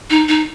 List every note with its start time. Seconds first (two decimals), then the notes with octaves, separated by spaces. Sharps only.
0.10 D#4
0.28 D#4